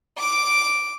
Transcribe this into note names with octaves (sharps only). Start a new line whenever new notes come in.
D6 D7